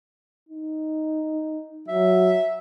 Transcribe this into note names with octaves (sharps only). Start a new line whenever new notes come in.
D#4
F#3 E5